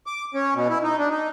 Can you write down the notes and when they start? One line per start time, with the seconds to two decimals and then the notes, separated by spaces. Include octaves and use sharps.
0.07 D6
0.34 C#4
0.55 B2
0.70 E4
0.84 D#4
0.98 D4
1.10 D#4